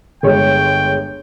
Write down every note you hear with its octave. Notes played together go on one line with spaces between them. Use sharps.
G1 G#3 C#5 G5